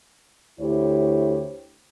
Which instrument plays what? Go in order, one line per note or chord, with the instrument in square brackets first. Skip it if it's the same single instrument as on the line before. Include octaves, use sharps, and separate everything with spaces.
[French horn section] D2 E4 G4 C5 C#5